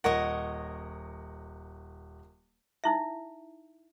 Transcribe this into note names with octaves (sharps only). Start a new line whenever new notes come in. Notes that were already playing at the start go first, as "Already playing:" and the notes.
D#1 A#4 C#5 D#5 F#5
D#4 E4 E5